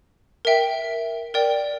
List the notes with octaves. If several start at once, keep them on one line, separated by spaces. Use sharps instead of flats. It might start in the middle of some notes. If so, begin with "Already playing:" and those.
A#4 E5 G5
A#4 D5 G5